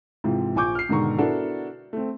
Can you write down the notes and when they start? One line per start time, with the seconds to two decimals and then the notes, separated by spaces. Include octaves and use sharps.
0.24 G#2 C3 E3 F3
0.55 A#1 F3 G#5 C#6 D6 G6
0.75 F6 C7
0.89 G#2 B2 D3 D#3 A#5 C#6
1.18 B3 D4 E4 F#4 A4 A#4
1.93 A3 C4